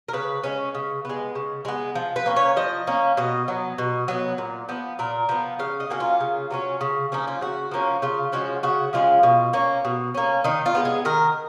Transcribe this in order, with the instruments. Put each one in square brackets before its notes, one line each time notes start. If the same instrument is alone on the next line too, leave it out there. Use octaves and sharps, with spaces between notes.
[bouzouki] A#4
C#3 B4
G#3 C#4
C#3
G#3 B3
C#3
G#3 B3
F3
B4
A#3 C#4
C#5
F3 D#5
A#3 C#4
B2 D#5
F#3 B3
B2
F#3 B3
A#2
F3 B3
A#2 A#4
F3 B3
C#3 F5
D#5
F#3 A#3 C#4
F4
C#3
F#3 A#3 C#4
C#3
F3 A#3 C#4 D#4
F4
C#3 F#4
F3 A#3 C#4
C#3 F4
F3 G#3 C#4 F#4
C#3 F#4
F3 G#3 C#4 F4
B2
A#3 C#4
B2
A#3 C#4
D#3 D#4
F4
G#3 B3
G#4
D#3 A#4